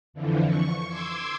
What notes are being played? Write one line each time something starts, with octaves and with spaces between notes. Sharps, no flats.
F2 D3 E3 F3
C#6
C6 D6 E6 G#6